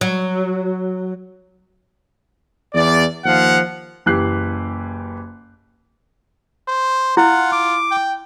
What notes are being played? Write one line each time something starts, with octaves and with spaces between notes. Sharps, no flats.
F#3
E2 D5
D#2 F3 F5 F#5
F#1 E3 G4 F#6 C7
C5
E4 F4 F#5
D6
G5